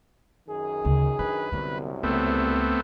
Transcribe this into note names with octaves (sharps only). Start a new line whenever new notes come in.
F#2 D#3 G#4
D2 C#3
D4 B4
C2 F#2 D3 B3
C#2 A3 B3 C4